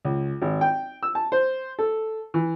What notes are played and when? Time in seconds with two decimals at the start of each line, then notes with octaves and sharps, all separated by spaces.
0.05 C#2
0.42 G#1
0.61 G5
1.03 E6
1.15 A5
1.32 C5
1.79 A4
2.34 E3